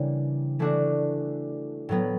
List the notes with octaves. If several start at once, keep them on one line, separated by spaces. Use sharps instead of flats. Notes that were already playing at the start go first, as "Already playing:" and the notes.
Already playing: C#3 E3 G3 A#3 D4
E3 A3 D4 F#4
A2 F#3 B3